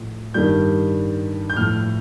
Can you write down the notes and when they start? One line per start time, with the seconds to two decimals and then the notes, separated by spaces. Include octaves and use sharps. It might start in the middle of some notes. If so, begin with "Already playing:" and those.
Already playing: A2 F3
0.34 G2 D#3 G3 G6
1.50 G6
1.57 A2 F3 F6